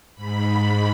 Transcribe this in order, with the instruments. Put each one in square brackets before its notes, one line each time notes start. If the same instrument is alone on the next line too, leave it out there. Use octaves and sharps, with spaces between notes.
[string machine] G#2 B5